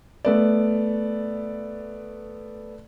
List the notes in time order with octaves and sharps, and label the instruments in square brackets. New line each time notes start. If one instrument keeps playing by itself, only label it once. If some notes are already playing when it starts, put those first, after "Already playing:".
[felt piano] A3 B3 D5